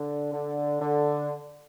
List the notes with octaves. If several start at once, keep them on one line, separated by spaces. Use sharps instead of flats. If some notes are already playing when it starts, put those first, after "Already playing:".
Already playing: D3
D3
D3